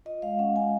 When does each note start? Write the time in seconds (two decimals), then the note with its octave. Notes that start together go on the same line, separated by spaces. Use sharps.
0.05 F4 D#5
0.22 G#3 F5
0.39 C#4 F#5
0.56 C#4 G#5